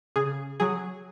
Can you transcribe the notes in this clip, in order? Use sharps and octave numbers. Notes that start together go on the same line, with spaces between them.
C#3 G#4
F#3 G#4